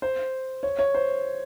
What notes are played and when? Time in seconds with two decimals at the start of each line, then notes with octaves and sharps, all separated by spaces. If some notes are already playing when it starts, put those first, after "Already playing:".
0.02 C5
0.63 C#5
0.79 C#5
0.95 C5